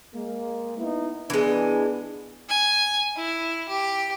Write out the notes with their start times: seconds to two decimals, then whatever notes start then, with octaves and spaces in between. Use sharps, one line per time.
0.14 G#3 A#3
0.78 B3 D#4 E4
1.30 E3 G#3 B3 D4
2.49 G#5
3.17 E4
3.69 G4